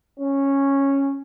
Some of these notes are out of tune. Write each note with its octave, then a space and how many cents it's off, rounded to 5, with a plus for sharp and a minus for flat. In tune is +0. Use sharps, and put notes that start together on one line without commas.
C#4 -10